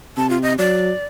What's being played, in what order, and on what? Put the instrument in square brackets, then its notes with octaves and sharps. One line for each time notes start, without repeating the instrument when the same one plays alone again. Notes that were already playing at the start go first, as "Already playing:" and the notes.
[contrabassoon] C3 [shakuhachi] A5
[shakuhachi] F4
D#5
[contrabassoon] F#3 [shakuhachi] D5